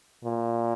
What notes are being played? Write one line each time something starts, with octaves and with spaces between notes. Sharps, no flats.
A#2